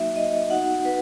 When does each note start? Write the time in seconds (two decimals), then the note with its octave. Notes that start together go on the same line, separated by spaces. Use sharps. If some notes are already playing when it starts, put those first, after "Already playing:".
Already playing: F#3 A#3 D#4 F#4 E5
0.16 D#5
0.50 B3 D#4 F#4 F#5
0.85 B4